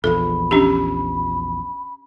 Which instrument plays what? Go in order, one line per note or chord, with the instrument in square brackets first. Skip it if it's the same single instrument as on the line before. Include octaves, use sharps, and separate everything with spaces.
[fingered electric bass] A#1 E2 F3 [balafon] A4 [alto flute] B5
[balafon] C#4 D4 G4